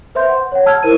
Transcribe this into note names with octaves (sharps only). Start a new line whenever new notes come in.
B4 C5 E5 C6 G6
F#5
C#5 F#5
A5 A#5 E6 F6 G#6
E4 A#4 C5 D#7